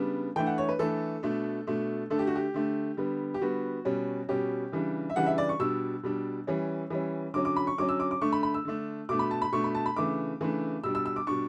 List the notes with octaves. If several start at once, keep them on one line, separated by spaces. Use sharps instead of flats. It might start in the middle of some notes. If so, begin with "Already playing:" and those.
Already playing: C#3 G3 B3 D4
E3 A3 D4 G5
F#5
C#5
B4
E3 A3 D4 A4
B2 A3 D4
B2 A3 D4
D3 A3 D4 A4
G4
F#4
G4
D3 A3 D4
D3 G3 B3
G4
D3 G3 B3 F#4
B2 G3 C#4
B2 G3 C#4 G4
C#3 E3 G3 D4
E5
C#3 E3 G3 D4 F#5
E5
D5
C#6
B2 G3 D4 E6
B2 G3 D4
E3 G3 C#4
E3 G3 C#4
D3 F#3 C#4 D6
D6
B5
C#6
D3 F#3 C#4 D6
E6
D6
D6
D3 A3 D4 C#6
B5
B5
E6
D3 A3 D4
B2 A3 D4 D6
B5
A5
B5
B2 A3 D4 C#6
B5
A5
B5
C#3 E3 A3 D4 D6
C#3 E3 A3 D4
B2 G3 D4 E6
E6
E6
D6
B2 G3 D4 C#6